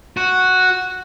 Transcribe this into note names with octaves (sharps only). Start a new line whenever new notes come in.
F#4